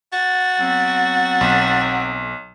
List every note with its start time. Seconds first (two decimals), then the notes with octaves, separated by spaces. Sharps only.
0.12 F#4 A6
0.60 F#3 B3 C4
1.41 B1